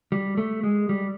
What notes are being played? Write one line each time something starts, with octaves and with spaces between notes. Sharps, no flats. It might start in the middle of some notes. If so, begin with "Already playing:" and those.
G3
A3
G#3
G3